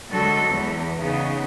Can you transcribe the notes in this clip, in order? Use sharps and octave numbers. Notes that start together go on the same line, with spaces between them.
D3 F#3 G#3 F#4 A4
E2
C#3 B3 D#4